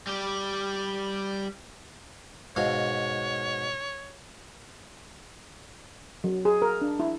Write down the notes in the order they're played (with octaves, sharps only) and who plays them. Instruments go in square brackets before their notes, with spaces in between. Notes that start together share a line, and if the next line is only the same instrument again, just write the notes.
[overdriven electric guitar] G3 G4
[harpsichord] G#2 B2 F5 [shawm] C#5
[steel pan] F#3
G#4
A#4
D4
E4